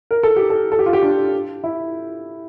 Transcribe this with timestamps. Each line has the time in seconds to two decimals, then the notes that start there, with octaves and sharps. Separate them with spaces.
0.11 A#4
0.23 A4
0.36 G4
0.50 A4
0.72 A4
0.79 G4
0.86 F4
0.93 G4
1.03 D4
1.64 E4